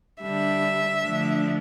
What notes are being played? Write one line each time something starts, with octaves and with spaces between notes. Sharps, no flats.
D3 G3 D4 E5
D3 F3 A3 D4